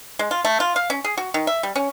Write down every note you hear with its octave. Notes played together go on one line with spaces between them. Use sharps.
G#3
F4
A3
F4
F5
C#4
G#4
F#4
D#3
E5
G3
C#4